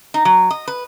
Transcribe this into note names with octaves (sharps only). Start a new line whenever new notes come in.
D#4
F#3
D#5
B4